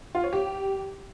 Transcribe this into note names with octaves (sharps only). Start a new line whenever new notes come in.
F4
C#5
G4